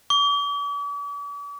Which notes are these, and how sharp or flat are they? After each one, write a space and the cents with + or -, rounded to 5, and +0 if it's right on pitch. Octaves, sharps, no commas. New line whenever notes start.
D6 -45